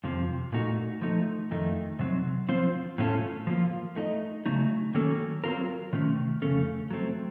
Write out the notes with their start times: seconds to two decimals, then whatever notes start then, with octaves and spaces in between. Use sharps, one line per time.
0.04 F2 C3 F3
0.52 A#2 A3 D#4 F#4
1.02 F3 A3 D#4
1.51 F2 D#3 A3 D#4
1.99 C3 F#3 C4
2.49 F3 C4 F4 C5
2.98 A2 A3 C#4 F4 A4
3.47 F3 A#3 F4
3.96 A3 D#4 A4 D#5
4.46 C#3 F#3 A3 D#4
4.94 D#3 F#3 A#3 C#4 A4
5.44 F#3 C4 F4 A#4
5.93 C3 D#3 A3 C#4
6.42 F2 C#3 A3 C#4 A4
6.91 F#3 A3 C4